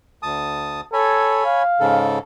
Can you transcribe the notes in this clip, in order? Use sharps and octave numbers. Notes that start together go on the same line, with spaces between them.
D2 A5 D#6
A4 C#5 G#5 B5
F5
G#2 C#3 A4